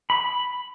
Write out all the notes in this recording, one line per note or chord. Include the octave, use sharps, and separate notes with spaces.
B5